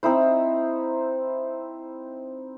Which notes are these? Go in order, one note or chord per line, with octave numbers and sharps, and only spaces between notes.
C4 D#4 E4 C5